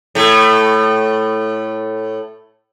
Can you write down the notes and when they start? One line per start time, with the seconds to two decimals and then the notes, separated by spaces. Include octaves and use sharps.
0.15 A2 A3